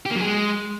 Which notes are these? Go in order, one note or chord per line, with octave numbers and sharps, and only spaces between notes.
G4
A#3
F#3
G#4
G#3